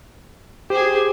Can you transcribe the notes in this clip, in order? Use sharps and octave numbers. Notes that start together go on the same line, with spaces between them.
G4 G#4 C5